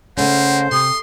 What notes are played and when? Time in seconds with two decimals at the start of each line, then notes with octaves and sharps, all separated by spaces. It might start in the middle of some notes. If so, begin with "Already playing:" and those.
0.18 C#3 A3 A#3 C#4 C5 F#5
0.72 C3 C6 D#6